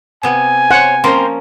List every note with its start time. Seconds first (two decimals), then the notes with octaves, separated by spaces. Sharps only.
0.23 C3 B3 G#5
0.71 C5 C#5 F#5
1.04 F3 A#3 C4 C#4 A#4 C5